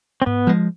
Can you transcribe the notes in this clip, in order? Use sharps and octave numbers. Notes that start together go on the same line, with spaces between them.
C4
G#2 B3
F3 G#3